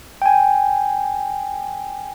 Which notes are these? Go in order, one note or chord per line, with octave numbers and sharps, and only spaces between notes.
G5 G#5